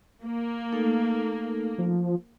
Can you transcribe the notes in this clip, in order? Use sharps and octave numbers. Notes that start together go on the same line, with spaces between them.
A#3
A3 D#4 A4
F3